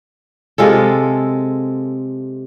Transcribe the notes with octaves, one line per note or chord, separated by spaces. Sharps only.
C3 G#3 F4 A4